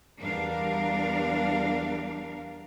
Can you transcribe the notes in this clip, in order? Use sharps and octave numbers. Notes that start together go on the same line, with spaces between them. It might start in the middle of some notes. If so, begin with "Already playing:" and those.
E2 G3 D4 A#4 F5